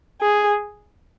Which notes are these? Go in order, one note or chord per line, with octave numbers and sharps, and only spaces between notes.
G#4